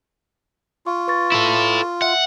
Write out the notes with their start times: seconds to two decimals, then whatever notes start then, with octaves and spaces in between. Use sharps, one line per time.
0.87 F4 C#6
1.08 B4 C#6 A6
1.32 E4 A4
2.02 E5 F#5